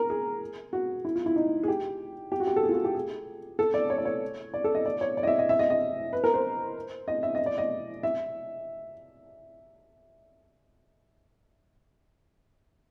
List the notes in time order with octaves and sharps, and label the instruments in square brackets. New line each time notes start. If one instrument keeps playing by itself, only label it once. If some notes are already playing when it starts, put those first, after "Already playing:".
Already playing: [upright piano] A#4
G#4
F#4
E4
F4
E4
D#4
G#4
G4
G4
F#4
G4
A4
G#4
F4
F#4
G4
G#4
A4
D5
C#5
D5
C#5
D5
A4
D#5
D5
C#5
D5
D#5
E5
D#5
E5
D#5
D#5
B4
A#4
C5
D#5
E5
D#5
D5
D#5
E5